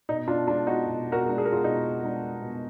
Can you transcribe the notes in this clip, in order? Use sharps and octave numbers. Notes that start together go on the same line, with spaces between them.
B2 D#4
D4 F4
G#3 D4 F4
D#4 F#4
B2
F#4 A#4
G#3 D4
G#4
A#4
F4 G#4
B2 D#4
G#3 D4
B2